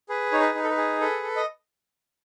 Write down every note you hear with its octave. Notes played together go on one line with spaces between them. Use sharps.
G#4 B4
D#4 C#5
B4
D#4
A4
B4
G#4
A4 B4
A4
D#5